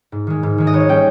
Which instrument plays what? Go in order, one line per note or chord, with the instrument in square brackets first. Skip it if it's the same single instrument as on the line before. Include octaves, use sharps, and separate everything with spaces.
[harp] G#2
D#3 G#3
G#2
D#3 G#3
D#5
G#1 C#5
G3 C#4 G5